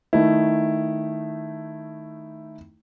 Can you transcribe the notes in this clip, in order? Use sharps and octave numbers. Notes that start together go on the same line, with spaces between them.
D#3 A3 D#4 E4